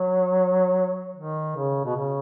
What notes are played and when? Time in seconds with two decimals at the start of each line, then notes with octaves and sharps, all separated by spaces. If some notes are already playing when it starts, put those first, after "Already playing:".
Already playing: F#3
1.16 D#3
1.56 C#3
1.85 B2
1.96 C#3